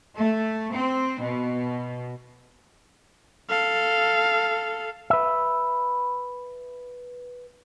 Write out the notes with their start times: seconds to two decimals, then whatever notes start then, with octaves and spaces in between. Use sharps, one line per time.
0.19 A3
0.74 C4
1.22 B2
3.50 A4 F5
5.10 B4 E5